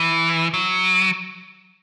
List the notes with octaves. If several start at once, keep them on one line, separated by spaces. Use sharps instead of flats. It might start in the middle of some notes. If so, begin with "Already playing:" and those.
Already playing: E3
F#3